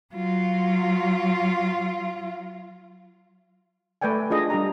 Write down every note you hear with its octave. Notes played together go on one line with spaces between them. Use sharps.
F#3 F4
A3 B4 D5 G5 G#5
D4 F4 G#4 D#5
G3 D4 G4 A#5